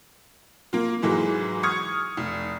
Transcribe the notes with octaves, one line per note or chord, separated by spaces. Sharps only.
A#3 F4
G#2 E3 F#3 G#3
C#6 D#6 F6 G#6 C#7
F1